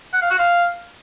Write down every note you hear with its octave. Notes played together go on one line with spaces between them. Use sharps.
F#5
F5
F#4
F5